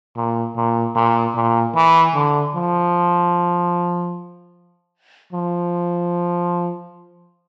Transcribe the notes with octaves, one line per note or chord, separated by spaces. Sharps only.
A#2
A#2
A#2
A#2
E3
D3
F3
F3